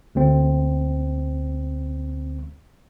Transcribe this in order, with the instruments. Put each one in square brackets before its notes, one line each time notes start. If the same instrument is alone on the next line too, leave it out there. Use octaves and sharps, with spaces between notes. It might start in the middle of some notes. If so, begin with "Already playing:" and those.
[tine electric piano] D2 C4